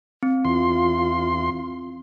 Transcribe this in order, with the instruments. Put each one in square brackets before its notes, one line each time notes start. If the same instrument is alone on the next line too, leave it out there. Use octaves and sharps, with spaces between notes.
[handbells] C4
[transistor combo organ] E2 C6 [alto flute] F4